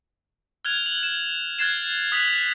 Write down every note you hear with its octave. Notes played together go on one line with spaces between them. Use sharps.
F6 F#6 G#6 F7
F#7
E7
F6 F#6 G#6 A6 C7 E7
D#6 F#6 B6 F7 F#7